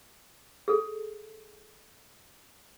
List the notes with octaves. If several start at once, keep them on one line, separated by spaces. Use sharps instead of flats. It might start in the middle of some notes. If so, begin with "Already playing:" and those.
G#4 A4